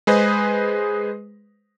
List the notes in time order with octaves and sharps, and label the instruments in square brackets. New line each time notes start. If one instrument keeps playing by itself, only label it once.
[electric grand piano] G#3 G#4 B4 C5 D#5